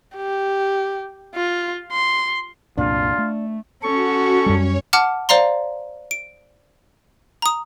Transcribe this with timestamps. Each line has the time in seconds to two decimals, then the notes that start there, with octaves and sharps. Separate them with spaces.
0.16 G4
1.35 F4
1.93 C6
2.78 C2 F#2 A#2 D4 F4
3.18 A3
3.83 C#4 F#4 A4 C#6
4.46 F#2 G3 C#5
4.93 F#5 A5 D6 F6
5.29 C5 D5 F5 A#5 C6
6.11 D7
7.42 A#5 D#6